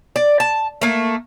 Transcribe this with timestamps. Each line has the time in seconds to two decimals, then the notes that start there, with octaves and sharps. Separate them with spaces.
0.16 D5
0.40 A5
0.82 A3 A#3